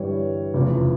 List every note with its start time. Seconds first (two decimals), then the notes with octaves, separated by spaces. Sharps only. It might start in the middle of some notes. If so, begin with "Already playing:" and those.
Already playing: G1 G2 E3 G3 C#5
0.54 F1 E2 C#3 F3